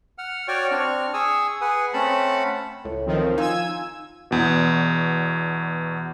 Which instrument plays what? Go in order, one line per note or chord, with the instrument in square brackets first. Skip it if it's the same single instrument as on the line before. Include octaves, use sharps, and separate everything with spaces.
[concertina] F#5 F6
F#4 C#5 D5 G5 C#6 F6
C4 D4 C#6 F6
G#4 G#5 C#6 D#6 E6
G#4 B4 F#5 G#5
A3 C4 C#4 F#5 A5 B5
[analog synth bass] C#2 [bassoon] A2
[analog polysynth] D#3 F3 C4
[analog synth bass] D#4 [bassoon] F4 [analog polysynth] G#5 E6 G#6
[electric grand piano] E2 B2